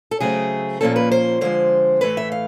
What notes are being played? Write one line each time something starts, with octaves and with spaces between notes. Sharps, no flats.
A4
C#3 F#3 A3 C4 G#4
A#2 F3 A#3 C#4 A4
B4
C5
D3 F3 G#3 C5
A2 E3 A3 B4
E5
F5